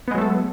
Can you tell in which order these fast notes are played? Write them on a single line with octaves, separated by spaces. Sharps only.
B3 G#3 F#3 A3 A4